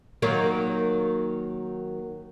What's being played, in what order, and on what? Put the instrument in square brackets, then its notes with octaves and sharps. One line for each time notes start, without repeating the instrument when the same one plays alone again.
[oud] D#3 F#3 A#3